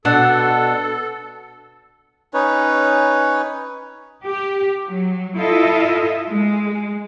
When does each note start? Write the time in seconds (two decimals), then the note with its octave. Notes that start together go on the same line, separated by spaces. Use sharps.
0.05 B2 D4 A4 F#5
2.34 C#4 D#4 B4 C#5
4.24 G4
4.88 F#3
5.37 E4 F4 A4 D#5 E5
6.29 G#3